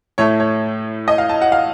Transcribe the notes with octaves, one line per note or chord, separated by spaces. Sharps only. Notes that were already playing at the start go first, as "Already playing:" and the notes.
A2 A3 C#5
C#5
D#5
F5
A5
F#5
F5